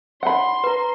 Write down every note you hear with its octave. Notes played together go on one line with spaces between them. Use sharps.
F#5 B5 C6
B4 A#5